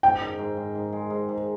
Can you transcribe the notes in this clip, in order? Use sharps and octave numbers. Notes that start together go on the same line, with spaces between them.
G#2 G5
D#3
G#2
G#2
G#2
G#3
G#2
G#2